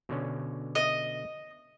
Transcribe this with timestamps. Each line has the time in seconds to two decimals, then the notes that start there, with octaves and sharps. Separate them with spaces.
0.09 B2 D3 C#4
0.75 D#5